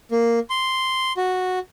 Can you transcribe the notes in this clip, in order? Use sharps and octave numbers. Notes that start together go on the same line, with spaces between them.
A#3
C6
F#4